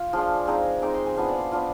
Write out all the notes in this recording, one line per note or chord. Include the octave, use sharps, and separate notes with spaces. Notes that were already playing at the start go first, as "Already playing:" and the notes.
Already playing: F4
F3 G#3 D4 C6
G#3 C4 D#4
G#3 C4 D#4 D6
C6
G#5
B3 D4 F4 F5
D5
C5
B3 D4 F4